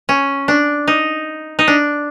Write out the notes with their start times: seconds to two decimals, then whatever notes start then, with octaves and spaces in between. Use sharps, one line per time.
0.09 C#4
0.48 D4
0.88 D#4
1.59 D#4
1.68 D4